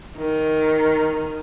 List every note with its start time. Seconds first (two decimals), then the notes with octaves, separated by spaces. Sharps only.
0.17 D#3